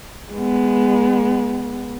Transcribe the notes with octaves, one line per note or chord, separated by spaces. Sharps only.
G#3 B3